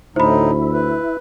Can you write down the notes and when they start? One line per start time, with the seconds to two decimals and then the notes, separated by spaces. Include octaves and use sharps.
0.16 D2 A2 D#4 E4 C5 B5
0.73 B4